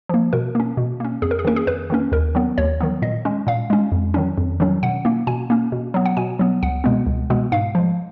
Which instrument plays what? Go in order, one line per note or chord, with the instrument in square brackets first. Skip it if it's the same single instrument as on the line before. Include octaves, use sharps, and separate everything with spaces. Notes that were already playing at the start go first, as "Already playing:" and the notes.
[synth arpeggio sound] F3 A#3
B2 A#4
A#3 C#4
B2
A#3 C#4
F2 G#4
A#4
G#4
D#3 A#3 C#4 A#4
G#4
F2 B4
D#3 A#3 C#4
D#2 A#4
D#3 F#3 B3
D#2 C#5
D#3 F#3 B3
A#2 D#5
G#3 C#4
A#2 F5
G#3 C#4
F2
D#3 F#3 C#4
F2
D#3 F#3 C#4
B2 F#5
A#3 C#4
B2 G#5
A#3 C#4
B2
F#3 B3
F#5
B2 G#5
F#3 B3
C#2 F#5
B2 G#3 B3
C#2
B2 G#3 B3
G#2 F5
F3 G#3